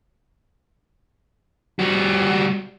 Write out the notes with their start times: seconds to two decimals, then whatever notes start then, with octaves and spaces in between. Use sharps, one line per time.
1.79 G3 F#4